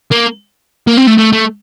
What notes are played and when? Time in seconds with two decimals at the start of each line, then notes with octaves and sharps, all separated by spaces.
0.11 A#3
0.87 A#3
0.97 C4
1.07 A3
1.18 A3
1.32 A3